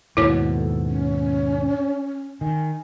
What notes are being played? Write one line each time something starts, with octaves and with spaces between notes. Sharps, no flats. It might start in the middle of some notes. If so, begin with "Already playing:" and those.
D#2 G#2 B2 E4 C#5
A4
C#4
D#3 G#5